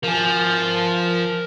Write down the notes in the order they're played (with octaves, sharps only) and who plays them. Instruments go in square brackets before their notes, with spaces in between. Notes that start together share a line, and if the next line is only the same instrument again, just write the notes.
[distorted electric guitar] F3 [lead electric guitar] A#4 G#5